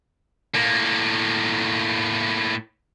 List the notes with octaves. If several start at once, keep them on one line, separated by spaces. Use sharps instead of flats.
A2 A#3